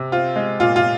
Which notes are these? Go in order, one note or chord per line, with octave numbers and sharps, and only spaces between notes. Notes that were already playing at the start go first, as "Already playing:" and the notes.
Already playing: C3
C4 F4
G#3
A#2 F4
F4